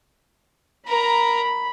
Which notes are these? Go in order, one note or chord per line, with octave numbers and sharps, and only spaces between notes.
A#4 A#5 B5